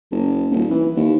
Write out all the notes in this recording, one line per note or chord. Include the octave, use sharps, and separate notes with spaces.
F#1
D#1
E3
D#2